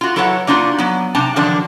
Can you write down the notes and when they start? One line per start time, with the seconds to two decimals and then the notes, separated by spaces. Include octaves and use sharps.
0.01 F4 F#4
0.16 F#3 E4 A4 B4 C#5 F#5
0.47 A#3 D4 D#4 F4 F#4
0.79 F#3 B3
1.15 C3 D4 D#4 A5 A#5
1.36 D3 D#3 F3 F#3 D4